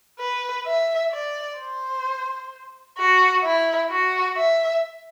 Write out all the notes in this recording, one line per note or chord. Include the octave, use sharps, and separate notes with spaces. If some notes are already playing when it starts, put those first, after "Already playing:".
B4
E5
D5
C5
F#4
E4
F#4
E5